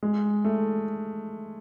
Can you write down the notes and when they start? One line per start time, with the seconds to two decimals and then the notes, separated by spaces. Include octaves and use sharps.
0.03 G#3
0.45 A3